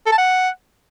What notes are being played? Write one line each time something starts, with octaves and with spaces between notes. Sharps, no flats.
A4
A5
F#5